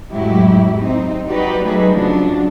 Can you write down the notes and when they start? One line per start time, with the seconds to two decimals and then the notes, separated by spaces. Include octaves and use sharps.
0.12 F2 A2 F#3 G#3 E4 G4
0.78 C4 D#4
1.29 F#3 D#4 F#4 G4 B4 D5
1.63 F#3 A3 D#4 G#4 B4
1.92 C#3 F3 F#3 D4